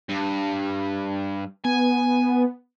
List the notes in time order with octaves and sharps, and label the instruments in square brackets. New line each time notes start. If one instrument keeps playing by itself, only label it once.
[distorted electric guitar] G2
[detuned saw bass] B3 [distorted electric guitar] G#5